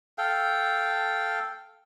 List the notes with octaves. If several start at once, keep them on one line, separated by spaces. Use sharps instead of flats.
A4 F5 G5